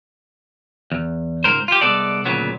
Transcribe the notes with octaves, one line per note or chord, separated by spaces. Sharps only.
E2
C#2 G#2 A#4 C5
F4 G4
C2 G#3 B3 A4 D5
D2 A#2 C#3 F#3 B3